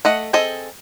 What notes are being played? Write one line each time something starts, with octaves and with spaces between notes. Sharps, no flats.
A3 D#5 F#5
C4 G#4 A4 D#5